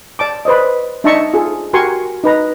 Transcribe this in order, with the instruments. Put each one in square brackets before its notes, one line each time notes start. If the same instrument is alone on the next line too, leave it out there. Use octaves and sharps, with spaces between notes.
[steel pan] D5 A5 D6
B4 C5 D5 D#5
D4 D#4 E5 A5 A#5 C#6
F4 G#4 A4
F#4 G4 A#4 G#5 C6 C#6
D#4 B4 A#5